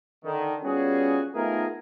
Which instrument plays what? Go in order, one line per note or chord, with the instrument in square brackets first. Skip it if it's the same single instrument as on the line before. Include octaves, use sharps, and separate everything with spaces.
[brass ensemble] D3 D#3
G3 B3 C#4 F4 F#4 G#4
A3 B3 D#4 F4 G#4 A#4